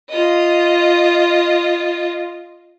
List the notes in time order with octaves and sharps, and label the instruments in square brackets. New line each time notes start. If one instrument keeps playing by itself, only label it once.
[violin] F4 D#5